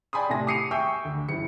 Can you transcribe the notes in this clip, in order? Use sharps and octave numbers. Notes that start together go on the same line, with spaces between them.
D5 G5 G#5 B5 C6 D#6
A2 C3 E4 G#5 A5 A#6
D6 D#6 C7 C#7 D#7 F7
E5 G5 G#5 C#6 E6 G6
D2
F#1 E4 C#7